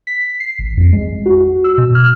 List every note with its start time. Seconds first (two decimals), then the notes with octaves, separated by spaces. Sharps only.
0.07 B6
0.40 C7
0.59 A1
0.77 F2
0.93 G#3
1.26 F#4
1.64 E6
1.78 B2
1.95 F6